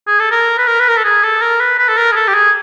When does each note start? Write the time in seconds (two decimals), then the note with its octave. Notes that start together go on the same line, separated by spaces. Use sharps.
0.07 G#4
0.19 A4
0.31 A#4
0.58 B4
0.67 A#4
0.80 B4
0.89 A#4
0.97 A4
1.04 G#4
1.23 A4
1.42 A#4
1.60 B4
1.78 B4
1.89 A4
1.97 A#4
2.11 G#4
2.16 A4
2.28 G4
2.34 G#4